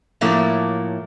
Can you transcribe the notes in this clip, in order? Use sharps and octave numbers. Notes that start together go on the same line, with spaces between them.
A2 F3 F#3 A3 A#3 E4